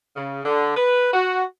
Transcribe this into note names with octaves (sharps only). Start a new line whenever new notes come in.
C#3
D3
B4
F#4